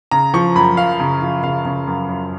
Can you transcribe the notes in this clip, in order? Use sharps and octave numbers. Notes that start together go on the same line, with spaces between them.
C#3 A#5
F3 C#6
F#2 B5
F#2 F5
C#3
F3
C#3 F5
C#3
F#2
F#2